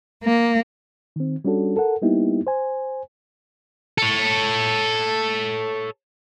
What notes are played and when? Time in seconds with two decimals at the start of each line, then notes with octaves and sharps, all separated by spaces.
0.24 A#3
1.16 D#3 C4
1.45 G3 C#4 D4 F#4 A4
1.77 A4 A#4 F#5
2.02 G3 A#3 B3 D#4 E4 G4
2.47 C5 G#5
3.98 A4 C#5